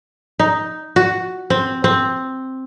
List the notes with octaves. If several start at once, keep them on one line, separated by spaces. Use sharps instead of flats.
D#4
F#4
C4
C4